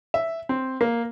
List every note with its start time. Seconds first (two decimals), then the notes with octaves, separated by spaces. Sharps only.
0.14 E5
0.49 C4
0.81 A#3